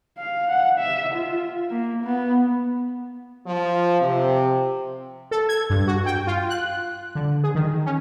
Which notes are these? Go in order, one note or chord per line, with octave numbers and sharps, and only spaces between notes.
F5
F#5
E5
F4
A#3
B3
F3
C3
A4
G#6
G2
F#4
G5
F4
F#6
D3
G#4
D#3
C#4